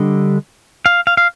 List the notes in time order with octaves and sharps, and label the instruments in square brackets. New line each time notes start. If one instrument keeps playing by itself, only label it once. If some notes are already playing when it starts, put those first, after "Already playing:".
Already playing: [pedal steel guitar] D3 G3 D4 D#5
F5
F5
F5